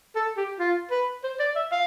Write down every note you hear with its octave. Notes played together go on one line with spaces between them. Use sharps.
A4
G4
F4
B4
C5
D5
E5
F5